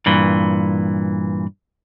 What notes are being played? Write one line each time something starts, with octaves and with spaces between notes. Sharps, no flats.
G2 A#2 E3